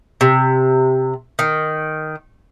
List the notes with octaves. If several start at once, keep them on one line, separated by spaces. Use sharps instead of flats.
C3
D#3